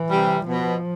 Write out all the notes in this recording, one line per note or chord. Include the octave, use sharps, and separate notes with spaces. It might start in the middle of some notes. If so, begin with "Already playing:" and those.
Already playing: E3
C3 G3
B2 F3